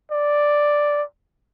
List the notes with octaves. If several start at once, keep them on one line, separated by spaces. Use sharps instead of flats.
D5